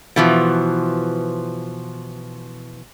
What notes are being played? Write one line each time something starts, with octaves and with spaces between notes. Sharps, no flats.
B2 E3 F3